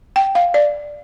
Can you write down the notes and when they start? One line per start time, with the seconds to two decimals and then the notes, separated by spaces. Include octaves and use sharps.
0.16 G5
0.35 F5
0.54 D5